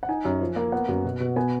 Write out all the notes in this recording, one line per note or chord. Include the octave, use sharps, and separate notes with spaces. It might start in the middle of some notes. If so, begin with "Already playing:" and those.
F#5
D#4 G#5
F#2
F3
A#3
B3 F#5
F#2
B2
B2
B3 G#5